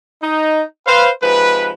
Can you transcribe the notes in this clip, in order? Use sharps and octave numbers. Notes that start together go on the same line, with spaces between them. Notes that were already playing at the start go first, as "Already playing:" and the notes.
D#4
B4 C5 F5
G#2 C3 F3 B4